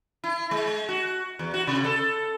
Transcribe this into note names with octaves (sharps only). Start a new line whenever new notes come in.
E4
G#3
F#4
E2
F#4
C3
A4